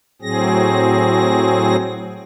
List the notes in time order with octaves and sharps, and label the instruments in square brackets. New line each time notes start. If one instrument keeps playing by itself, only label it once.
[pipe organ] A2 F#3 C4 G#4 A#6